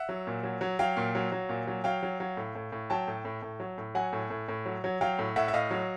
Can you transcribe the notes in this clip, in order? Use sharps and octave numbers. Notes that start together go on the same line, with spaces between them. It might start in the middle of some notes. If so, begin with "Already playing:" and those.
Already playing: E5 F#5
F#3
A#2
F#3
F#3
F#3 F5 G5
A#2
F#3
F#3
A#2
F#3
F#3 F5 G5
F#3
F#3
A2
A2
A2
F#3 G5 A5
A2
A2
A2
F#3
A2
F#3 F#5 G#5
A2
A2
A2
F#3
F#3
F#3 F5 G5
A2
A2 E5 F#5
E5
A2 D#5 F5
F#3